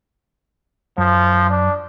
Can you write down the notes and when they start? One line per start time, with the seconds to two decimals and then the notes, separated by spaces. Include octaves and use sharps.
0.98 F#2 F3
1.50 D4